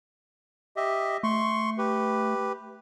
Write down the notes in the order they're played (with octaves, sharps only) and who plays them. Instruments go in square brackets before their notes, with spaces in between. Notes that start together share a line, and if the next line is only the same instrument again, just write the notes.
[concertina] G4 D#5 E5
[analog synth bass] A3 [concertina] C6 C#6
[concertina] G4 B4